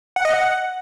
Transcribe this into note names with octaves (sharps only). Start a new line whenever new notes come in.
F#5
D#5
F#5